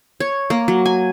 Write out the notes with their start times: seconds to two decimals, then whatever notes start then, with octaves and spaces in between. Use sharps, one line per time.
0.20 C#5
0.50 A#3
0.68 F#3
0.86 G#5